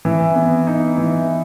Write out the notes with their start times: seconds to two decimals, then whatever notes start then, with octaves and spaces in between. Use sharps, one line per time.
0.05 E3
0.35 B3
0.67 D#4
0.98 E3